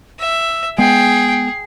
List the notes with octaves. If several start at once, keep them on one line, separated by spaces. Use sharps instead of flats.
E5 E6
G#3 B3 G#4 G5 C7